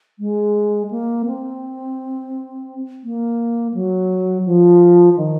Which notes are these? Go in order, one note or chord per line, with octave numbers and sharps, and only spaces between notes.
G#3
A#3
C4
A#3
F#3
F3
D#3